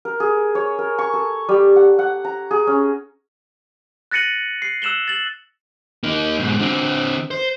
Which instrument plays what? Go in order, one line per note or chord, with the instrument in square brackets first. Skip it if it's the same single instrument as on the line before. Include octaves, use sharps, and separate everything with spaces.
[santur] A#4
G#4
C#5
A#4
C#6
A4
G3
F#5
F#5
A#5
G#4
C#4
[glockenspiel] F#6 A6 A#6 C#7 D#7 F#7
C7
E6 F#6 E7 F#7 G7
A6 F#7
[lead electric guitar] A#3 D#4
G#2 B2
D3 C4
C5